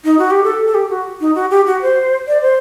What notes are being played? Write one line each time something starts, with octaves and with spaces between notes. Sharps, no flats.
D#4
F#4
G4
A4
A4
G4
F#4
D#4
F#4
G4
F#4
C5
D5
C5